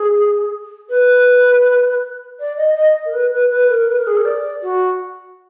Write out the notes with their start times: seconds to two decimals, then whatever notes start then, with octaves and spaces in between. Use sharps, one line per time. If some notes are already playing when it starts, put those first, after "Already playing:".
Already playing: G#4
0.90 B4
2.40 D5
2.57 D#5
2.76 D#5
3.06 A#4
3.13 B4
3.33 B4
3.51 B4
3.69 A#4
3.88 B4
3.98 A#4
4.07 G#4
4.17 A#4
4.25 D5
4.63 F#4